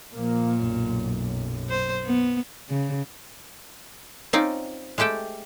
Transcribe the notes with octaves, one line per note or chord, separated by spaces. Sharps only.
A#2 F3 A#3
B1 F#2
C5
B3
C#3
C4 C#4 D#4 F4 D5
G#3 A3 G4 A4 G5